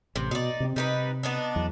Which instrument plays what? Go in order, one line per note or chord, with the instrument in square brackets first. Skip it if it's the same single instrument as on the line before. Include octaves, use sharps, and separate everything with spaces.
[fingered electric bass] A1 [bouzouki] C3
[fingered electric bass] B2 [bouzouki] D#4 D5
[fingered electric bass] C3 A#3 C4
[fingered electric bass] C3 [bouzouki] G3 D#4 B4
[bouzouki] B3 D4 D#4
[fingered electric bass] E2 F#3